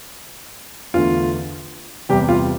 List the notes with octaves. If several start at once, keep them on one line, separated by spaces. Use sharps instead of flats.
E2 D3 A3 F4
E2 C3 G3 G4
F4